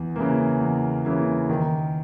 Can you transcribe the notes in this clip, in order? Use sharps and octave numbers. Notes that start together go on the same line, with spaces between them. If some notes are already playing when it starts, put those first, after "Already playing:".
Already playing: E2
C#3 E3 A#3
E2
C#3 E3 A#3
D#3